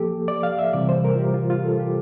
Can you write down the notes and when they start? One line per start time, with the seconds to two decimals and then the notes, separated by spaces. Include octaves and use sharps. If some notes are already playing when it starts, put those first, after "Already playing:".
Already playing: F3 A#3 G4 A4
0.28 D5
0.43 F5
0.59 E5
0.73 C3 E3 G3 D5
0.89 C5
1.05 A#4
1.15 F4
1.19 G4
1.34 F4
1.50 F4
1.64 A4
1.80 G4